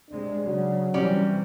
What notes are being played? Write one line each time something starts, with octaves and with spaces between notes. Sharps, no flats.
C3 G#3 D4
C#3 F#3
C3 E3 G3 C#4 G4 D5